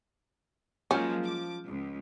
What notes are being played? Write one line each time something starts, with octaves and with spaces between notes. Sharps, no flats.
F3 F#3 G#3 A#3 C#4
D6
C#2